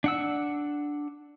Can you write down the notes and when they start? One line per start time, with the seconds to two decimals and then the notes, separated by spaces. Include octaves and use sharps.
0.04 D4 F#5 E6